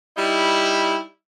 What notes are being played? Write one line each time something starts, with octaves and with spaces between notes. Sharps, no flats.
G3 D#4 E4